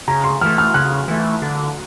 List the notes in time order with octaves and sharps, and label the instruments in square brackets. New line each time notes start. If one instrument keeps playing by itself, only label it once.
[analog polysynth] C#3 [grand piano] A#5
[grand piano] C6
[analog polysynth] E3 A3 [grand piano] F6
[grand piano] F6
[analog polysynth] C#3 [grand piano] F#6
[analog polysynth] E3 A3
D3